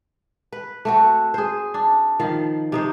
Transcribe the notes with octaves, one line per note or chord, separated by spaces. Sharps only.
B4
A3 C4 F#4
G#4 C5
D4
D#3 F3 F4
C3 D#4 C5